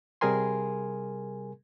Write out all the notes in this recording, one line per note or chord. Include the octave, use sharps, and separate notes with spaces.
C3 G3 G#4 A#4 G#5 C6